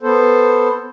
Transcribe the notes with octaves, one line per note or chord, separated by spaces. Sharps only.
B3 A4 C5